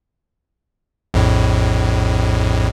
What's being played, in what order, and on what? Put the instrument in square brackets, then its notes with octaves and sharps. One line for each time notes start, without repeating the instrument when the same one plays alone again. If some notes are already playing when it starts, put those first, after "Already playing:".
[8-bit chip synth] A#1 F2 A2